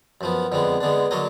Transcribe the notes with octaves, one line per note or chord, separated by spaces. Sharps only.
F#2 F3 B3
F2 D3 G#3 B3
D3 G#3 B3 D4
D3 F#3 A#3 D4 D#5